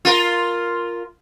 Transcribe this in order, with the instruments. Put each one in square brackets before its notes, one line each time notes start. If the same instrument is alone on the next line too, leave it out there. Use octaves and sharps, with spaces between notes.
[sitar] F4 A#4